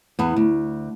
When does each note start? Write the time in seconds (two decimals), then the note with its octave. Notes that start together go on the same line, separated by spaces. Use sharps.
0.19 E2 B3
0.36 D2